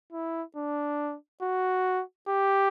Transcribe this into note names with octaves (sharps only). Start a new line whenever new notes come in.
E4
D4
F#4
G4